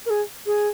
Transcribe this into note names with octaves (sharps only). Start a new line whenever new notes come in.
A#4
G#4
G#4